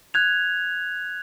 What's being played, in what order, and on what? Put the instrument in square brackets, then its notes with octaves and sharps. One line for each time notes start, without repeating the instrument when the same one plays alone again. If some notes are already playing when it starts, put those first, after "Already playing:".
[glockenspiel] F#6 G#6 F7